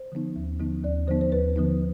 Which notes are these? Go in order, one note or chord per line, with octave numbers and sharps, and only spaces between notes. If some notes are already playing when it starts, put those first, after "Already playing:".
Already playing: C5
D3 F3 B3 D#4
D#2
D3 F3 B3 D#4
D#2 D5
D3 F3 B3 D#4 C5
C5
D#2 B4
D3 F3 B3 D#4